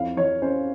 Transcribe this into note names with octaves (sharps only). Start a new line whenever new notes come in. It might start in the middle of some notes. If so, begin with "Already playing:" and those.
Already playing: F2 E4 F5
E3 C#5
C#4 C5